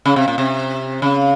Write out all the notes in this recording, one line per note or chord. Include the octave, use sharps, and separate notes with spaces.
C#3
C3
A#2
C3
C#3